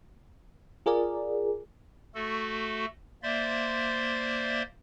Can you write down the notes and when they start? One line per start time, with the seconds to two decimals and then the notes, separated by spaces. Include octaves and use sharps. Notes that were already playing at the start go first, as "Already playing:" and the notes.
0.86 F4 G#4 A#4 D5
2.15 A3 F#4 A4
3.23 A#3 C5 D5 E5 C6